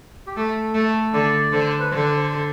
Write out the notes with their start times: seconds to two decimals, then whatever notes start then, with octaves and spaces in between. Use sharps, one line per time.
0.27 G4
0.36 A3 A4
0.75 A3
1.13 D3 D5
1.53 D3 C5
1.80 B4
1.91 D3 C5
2.17 C5